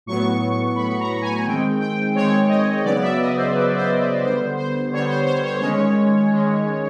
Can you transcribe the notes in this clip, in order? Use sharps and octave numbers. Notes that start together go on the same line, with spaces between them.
A2 F#3 B3 C#6
A2 F#3 B3 B5
A#5
G#5
D#3 G#3 C4 G5
G5
D#3 G#3 C4 C#5
D#5
C#3 F#3 B3 D5
E5
D#5
C5
C#3 F#3 B3 B4
C5
B4
D3 G3 B3 C5
C5
D3 G3 B3 C#5
C5
C5
C#5
D#3 G#3 C#4 C#5
D#3 G#3 C#4